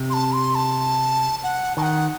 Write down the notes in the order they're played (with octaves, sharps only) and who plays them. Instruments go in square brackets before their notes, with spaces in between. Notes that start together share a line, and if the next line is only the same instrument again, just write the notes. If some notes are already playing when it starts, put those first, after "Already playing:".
Already playing: [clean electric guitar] C3
[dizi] C6
A5
C6
A5
F#5
[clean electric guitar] D#3 [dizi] A5
[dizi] F#5